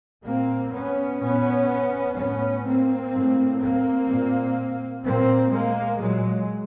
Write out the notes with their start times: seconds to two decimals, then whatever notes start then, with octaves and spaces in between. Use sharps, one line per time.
0.25 A#2 A#3 C4
0.73 B3 C#4
1.20 A#2 B3 C#4
2.16 A2 B3 C#4
2.64 A#3 C4
3.11 A2
3.59 A#3 C4
4.08 A#2
5.04 A#2 A#3 C4
5.51 G#3 A#3
5.98 A#2 F#3 G#3